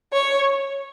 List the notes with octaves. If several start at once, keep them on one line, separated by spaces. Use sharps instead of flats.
C#5